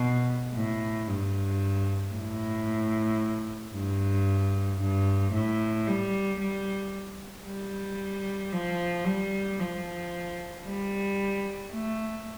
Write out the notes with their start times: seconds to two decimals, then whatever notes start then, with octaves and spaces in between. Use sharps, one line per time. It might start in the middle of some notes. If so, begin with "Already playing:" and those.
Already playing: B2
0.54 A2
1.08 G2
2.14 A2
3.74 G2
4.81 G2
5.33 A2
5.87 G3
6.40 G3
7.46 G3
8.53 F3
9.05 G3
9.59 F3
10.66 G3
11.72 A3